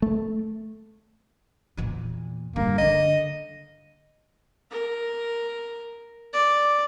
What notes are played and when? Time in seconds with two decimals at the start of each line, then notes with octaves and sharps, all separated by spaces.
0.02 A3
1.77 E2 A#2
2.56 G2 D3 A#3
2.78 D3 D4 D#5
4.71 A#4
6.34 D5